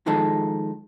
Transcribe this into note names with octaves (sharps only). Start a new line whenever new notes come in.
D#3 F3 G#3 D#4 A4